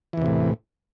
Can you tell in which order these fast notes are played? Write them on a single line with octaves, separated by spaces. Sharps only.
E3 E2 C3 A2